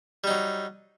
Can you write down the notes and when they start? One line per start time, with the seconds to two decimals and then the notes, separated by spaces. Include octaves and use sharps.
0.24 G3
0.27 D#4
0.30 F#3